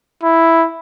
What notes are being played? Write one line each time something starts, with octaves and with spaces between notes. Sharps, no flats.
E4